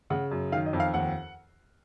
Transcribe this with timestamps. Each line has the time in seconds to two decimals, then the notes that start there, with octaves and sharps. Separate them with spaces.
0.10 C#3 F#5
0.31 F#2
0.52 D#3 F5
0.66 D#5
0.73 F2
0.80 F5
0.94 D#2 F#5